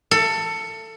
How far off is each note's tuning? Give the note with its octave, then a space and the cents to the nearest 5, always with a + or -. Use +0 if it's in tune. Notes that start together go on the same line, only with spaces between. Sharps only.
A4 +20